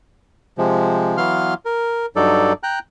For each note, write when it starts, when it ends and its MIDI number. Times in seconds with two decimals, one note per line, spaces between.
0.58 1.17 48
0.58 1.17 53
0.58 1.17 56
1.17 1.54 52
1.17 1.54 54
1.17 1.54 59
1.17 1.54 77
1.17 1.54 84
1.17 1.54 89
1.65 2.06 70
2.16 2.53 43
2.16 2.53 54
2.16 2.53 63
2.16 2.53 69
2.16 2.53 74
2.63 2.79 79
2.63 2.79 82
2.63 2.79 90